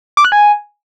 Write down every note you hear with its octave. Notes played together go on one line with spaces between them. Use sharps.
D6
F#6
G#5